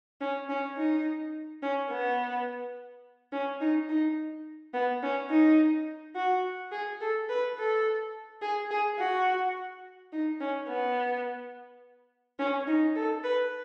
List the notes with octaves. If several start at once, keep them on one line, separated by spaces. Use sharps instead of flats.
C#4
C#4
D#4
C#4
B3
C#4
D#4
D#4
B3
C#4
D#4
F#4
G#4
A4
B4
A4
G#4
G#4
F#4
D#4
C#4
B3
C#4
D#4
A4
B4